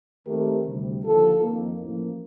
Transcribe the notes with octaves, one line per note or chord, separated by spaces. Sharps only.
D#2 D#3 A3 C4 G4 A#4
D2 C3 G3
D#2 D3 F3 F4 A4
F2 D#3 A#3
A1 A2 F3 A#3